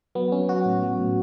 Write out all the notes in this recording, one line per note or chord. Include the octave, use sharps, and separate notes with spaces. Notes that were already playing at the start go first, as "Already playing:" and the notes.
F#3 B3
F#3 C#4
F#3 F#4
A2
F#3
A2